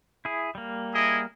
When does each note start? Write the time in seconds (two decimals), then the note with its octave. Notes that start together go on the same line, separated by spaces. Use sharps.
0.25 E4 G#4
0.55 G3 A#3
0.94 E4 G#4 D#5